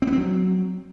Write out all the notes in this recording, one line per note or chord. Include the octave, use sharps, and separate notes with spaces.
C4
B3
C4
F#3